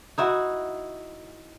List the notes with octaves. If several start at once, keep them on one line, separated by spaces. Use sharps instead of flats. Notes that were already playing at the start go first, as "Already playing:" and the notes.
D#4 E4 F#4